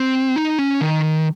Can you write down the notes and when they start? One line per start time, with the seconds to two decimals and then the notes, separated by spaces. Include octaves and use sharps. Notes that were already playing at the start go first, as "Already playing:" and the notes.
Already playing: C4
0.36 D#4
0.58 C#4
0.81 D#3